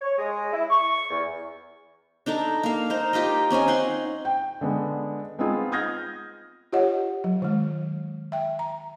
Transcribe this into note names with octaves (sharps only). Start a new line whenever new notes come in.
C#5
G#3
E4
C#6
E2
D4 D#4 A4 A#5
A#3 F5
D#4 C5 A#5
F4 G4 A#4 D#5
C4 C#4 D#4 G#5
D#4 F#5 C6
G5
D3 G#3 B3
G#3 B3 C4 D#4 F4 G#4
D#6 F6 G6 G#6 A#6
F4 G4 C#5 D#5 F#5
F#3
D#3 G#3
E5 G5
A#5